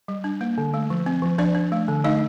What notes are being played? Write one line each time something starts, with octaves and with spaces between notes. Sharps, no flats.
G3
D4
A#3
D3
A3
F3
C4
F3
F3 D4 D5
D4
A3
D3
A3 D#4 D#5